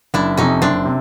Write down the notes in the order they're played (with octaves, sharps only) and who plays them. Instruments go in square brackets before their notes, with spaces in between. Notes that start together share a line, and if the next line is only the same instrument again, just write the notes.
[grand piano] F#1 [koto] D4 E4
[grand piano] F2 C3 [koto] C#4 D#4
[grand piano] F#1 [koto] C4 D4
[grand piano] C3